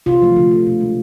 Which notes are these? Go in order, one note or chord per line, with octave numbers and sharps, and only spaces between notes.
C3 F4
F3 A3
D3
A3
B2
G#3